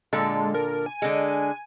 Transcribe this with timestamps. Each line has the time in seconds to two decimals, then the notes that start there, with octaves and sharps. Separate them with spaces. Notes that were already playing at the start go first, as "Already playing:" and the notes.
0.13 A#2 D3 G#3 A4
0.54 A#4
0.86 G#5
1.02 D3 G#3